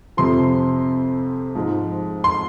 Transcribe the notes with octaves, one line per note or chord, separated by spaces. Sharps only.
F2 C3 F3 C6
G#2 F3
C6